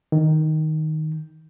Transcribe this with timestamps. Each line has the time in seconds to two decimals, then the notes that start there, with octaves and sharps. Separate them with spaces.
0.12 D#3